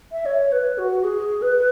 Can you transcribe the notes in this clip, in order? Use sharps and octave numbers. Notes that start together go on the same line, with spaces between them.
E5
C#5
B4
F#4
G#4
B4